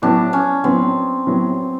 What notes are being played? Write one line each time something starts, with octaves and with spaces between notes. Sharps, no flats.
A2 F#3 B3 D4
C#4
A2 F#3 B3 C4
A2 F#3 B3